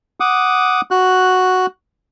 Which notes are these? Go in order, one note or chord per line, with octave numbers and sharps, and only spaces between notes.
F#5 D6 D#6
F#4 F#6